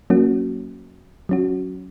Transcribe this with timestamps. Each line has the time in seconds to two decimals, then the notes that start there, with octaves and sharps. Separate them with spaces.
0.10 F#3 A#3 C#4 F#4
1.29 F#3 C#4 F#4